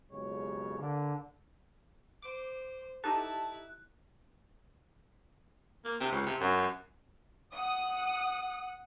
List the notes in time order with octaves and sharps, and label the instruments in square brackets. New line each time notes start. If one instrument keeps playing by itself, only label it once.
[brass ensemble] B1 F2 C#3 G#3 G4 C#5
D3 A#3
[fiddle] C5 [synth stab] D6
[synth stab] D#4 G4 A4 [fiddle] E4 [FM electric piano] A5 [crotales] F#6
[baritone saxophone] A#3
C3
C#2
C3
F#2
[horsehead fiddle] F#5 [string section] D#6